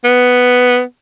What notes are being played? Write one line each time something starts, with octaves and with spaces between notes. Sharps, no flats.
B3